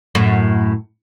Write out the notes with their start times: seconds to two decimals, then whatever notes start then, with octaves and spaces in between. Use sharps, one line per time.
0.15 F#2 A2